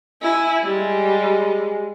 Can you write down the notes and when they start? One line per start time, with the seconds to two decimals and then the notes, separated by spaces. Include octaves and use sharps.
0.22 E4 G#5
0.64 G3 G#3